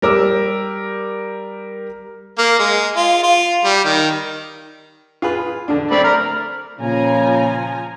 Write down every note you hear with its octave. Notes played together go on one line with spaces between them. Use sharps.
G3 A#4 D6 E6
A#3
G#3
F4
F4
G3
D#3
F4 G#4 B4
D3 D4
A3 C4 D5 B5
A#5 F6
A#2 C#3 F3 G#5 A#5